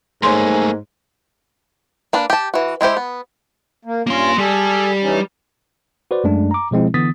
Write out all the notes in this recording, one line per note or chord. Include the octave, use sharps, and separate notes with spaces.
G#2 A3 A#3 C#5 G#5 C6
A#3 D4 B4
G4 A5
E3 F#4
G#3 E4 G4 C5
B3
A#3
G2 A#3 C#4 F4 C6
G3 G#4 A4
E3 C#4 D#4
F#4 B4 C5 D5
F#2 G#3 A3 D4
A#5 D6
B2 F3 G#3 C4 E4
D3 E3 B3 D#6 A6 B6